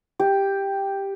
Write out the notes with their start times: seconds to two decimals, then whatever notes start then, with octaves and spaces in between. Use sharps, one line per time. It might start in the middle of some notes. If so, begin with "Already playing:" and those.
0.19 G4